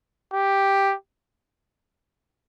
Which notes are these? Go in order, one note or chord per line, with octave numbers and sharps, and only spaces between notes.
G4